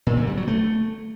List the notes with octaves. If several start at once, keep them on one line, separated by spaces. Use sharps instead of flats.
A#2
D3
G3
F#3
A3